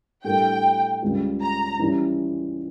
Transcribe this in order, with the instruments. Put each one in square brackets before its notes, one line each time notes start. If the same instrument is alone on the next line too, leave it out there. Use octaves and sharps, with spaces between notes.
[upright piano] A2 G3 D4 A4 [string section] G5
[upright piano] C#2 C#3 G3
[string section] A#5
[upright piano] E3 G3 C#4